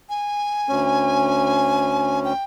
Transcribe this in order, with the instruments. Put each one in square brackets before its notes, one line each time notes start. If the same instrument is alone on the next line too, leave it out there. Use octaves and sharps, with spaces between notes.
[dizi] G#5
[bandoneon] D2 C#4
[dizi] G5